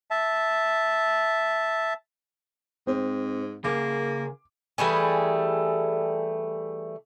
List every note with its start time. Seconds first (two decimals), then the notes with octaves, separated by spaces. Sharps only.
0.11 E5 A5
2.87 G#2 C4
3.64 C#3 A#3 G#4 A#4 D6
4.78 E3 G3 A3 G#4